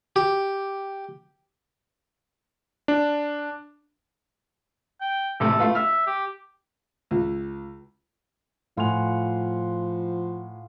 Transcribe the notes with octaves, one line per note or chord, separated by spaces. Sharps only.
G4
D4
G5
A1 C3 A3 A4
A3 F4 B4
E5 F6
G4
C#2
A2 F3 F4 F#5 G#5 F7